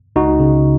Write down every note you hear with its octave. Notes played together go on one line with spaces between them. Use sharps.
C#2 D#4 F#4
C#3